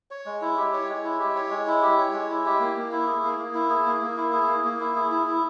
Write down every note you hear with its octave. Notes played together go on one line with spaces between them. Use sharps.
C#5
G#3
E4
G4
C#5
G#3
E4
G4
C#5
G#3
E4
G4
C#5
G#3
E4
G4
A#3
A#3
E4
G#4
A#3
A#3
E4
G#4
A#3
A#3
E4
G#4
A#3
A#3
E4
G#4
E4
E4